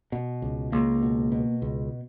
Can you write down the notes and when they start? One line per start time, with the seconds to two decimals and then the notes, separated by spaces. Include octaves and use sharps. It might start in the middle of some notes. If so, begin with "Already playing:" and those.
0.12 B2
0.42 C#2
0.72 C#2 A#3
1.03 B2
1.32 B2
1.62 C#2